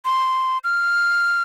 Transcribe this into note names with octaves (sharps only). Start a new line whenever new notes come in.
C6
F6